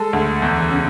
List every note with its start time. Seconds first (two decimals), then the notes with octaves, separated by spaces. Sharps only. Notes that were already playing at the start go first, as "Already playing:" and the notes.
Already playing: G#3 A4
0.13 D2
0.42 E2
0.71 C#3